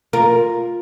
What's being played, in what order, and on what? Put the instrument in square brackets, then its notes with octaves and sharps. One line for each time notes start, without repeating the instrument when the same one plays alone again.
[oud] F4 A#4